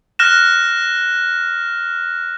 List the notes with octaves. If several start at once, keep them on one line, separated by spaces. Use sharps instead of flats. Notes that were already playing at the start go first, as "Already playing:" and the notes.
F6 F#6 A#6 E7